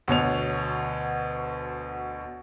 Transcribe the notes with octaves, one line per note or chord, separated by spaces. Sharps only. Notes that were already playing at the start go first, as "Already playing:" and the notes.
D2 B2 C#5 F7